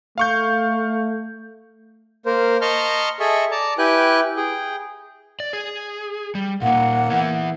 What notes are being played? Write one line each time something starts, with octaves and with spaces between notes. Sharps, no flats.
A3 F5 C#6 G6
A#3 A#4 C5
D#5 A5 A#5 C6 C#6 F6
G#4 A4 D#5 E5 C#6
D5 A5 A#5
E4 G4 B4 G5 G#5 F#6
G#4 G5
D5
G#4
G3
A#2 A#3 D#4 F#5
E3 B3 E4